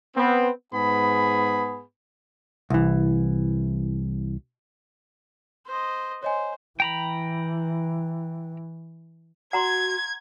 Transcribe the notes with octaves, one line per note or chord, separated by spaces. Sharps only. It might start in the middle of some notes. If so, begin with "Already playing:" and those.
B3 C4
G#2 B3 G#4 B5
C2 E3
C5 D#5
C5 C#5 D#5 G#5
E3 G5 A#5 B5
F#4 F#5 A#5 C6 G#6